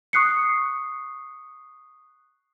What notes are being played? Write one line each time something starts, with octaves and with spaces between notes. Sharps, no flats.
C#6 D#6 F#6 C7 C#7